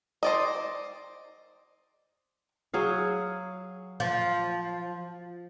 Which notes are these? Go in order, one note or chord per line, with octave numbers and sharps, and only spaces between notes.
C5 D5 D#5
F#3 G#4 F5
F3